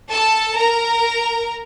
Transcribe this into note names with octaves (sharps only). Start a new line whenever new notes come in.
A4 A5
A#4 A#5